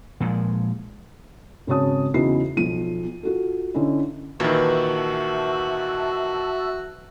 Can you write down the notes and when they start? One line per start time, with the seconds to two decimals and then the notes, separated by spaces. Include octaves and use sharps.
0.20 A#2 F3 G#3
1.67 G#1 C#3 F#4 C#5 A5 D#6
2.14 E2 C#3 D#4 E4 F#4 C7
2.57 B1 F3 D#7
3.23 F4 F#4 A4
3.74 D3 C#4 D#4 E4
4.40 A#2 D#3 E3 F#4 E5 A5 E6